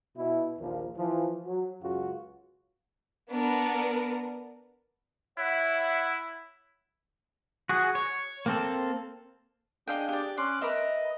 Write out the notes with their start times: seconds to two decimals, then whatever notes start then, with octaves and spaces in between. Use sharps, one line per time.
0.16 B2 E4
0.59 A#1 D#2 F3 A#3
0.97 E3 F3
1.45 F#3
1.82 C#2 F#2 C#3 F4 F#4
3.30 B3 D4 A#4
5.38 E4 C#5 E5 F#5
7.69 F#4 G#4
7.95 C#5
8.46 A#3 C4 A4
9.87 D4 G#4 D#5 F5 G5
10.09 G4 D5
10.38 C#4 C6 D6 F#6
10.61 A#4 B4 D#5 E5